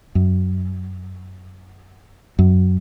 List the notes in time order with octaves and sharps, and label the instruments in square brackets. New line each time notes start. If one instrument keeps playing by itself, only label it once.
[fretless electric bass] F#2
F#2